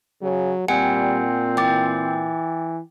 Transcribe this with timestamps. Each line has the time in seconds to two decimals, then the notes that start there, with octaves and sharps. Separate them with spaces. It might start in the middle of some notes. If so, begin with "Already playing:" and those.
0.22 C#3 F#3
0.68 A#2 G3 C4 F#5 G#5 C#7
1.57 E3 G5 D6 A6